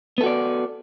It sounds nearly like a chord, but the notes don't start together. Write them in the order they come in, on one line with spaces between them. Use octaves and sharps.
B3 A4 F#4 D5